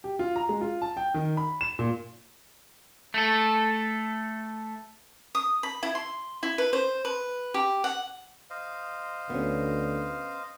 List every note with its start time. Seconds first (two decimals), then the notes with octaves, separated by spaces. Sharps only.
0.04 G4
0.19 F4
0.36 A#5
0.49 G#3
0.61 F4
0.82 A5
0.97 G5
1.14 D#3
1.37 B5
1.61 E7
1.79 A#2
3.14 A3 A4
5.35 D#6
5.63 B5
5.83 E4
5.95 C6
6.43 E4
6.58 B4
6.73 C5
7.05 B4
7.54 G4
7.84 F#5
8.50 C5 D#5 F5
9.30 D2 B3 C#4